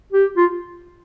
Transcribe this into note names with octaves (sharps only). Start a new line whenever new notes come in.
G4
F4